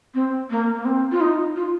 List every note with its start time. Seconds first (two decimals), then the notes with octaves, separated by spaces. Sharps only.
0.14 C4
0.50 A#3
0.74 A#3
0.85 C4
1.12 F4
1.21 D#4
1.56 F4